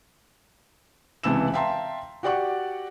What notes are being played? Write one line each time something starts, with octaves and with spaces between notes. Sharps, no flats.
C#2 C3 E3 A5 E6 E7
E5 F5 G5 A5 A#5 C6
F#4 G4 D5 F#5 C#6